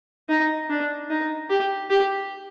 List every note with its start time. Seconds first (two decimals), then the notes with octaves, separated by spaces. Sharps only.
0.29 D#4
0.70 D4
1.10 D#4
1.50 G4
1.90 G4